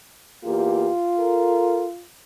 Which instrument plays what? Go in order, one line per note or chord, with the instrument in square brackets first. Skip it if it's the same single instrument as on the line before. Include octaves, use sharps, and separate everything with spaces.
[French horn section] E2 A#3 G4 [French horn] F4
[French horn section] A4 A#4